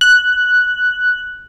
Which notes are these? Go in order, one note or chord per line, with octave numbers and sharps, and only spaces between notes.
F#6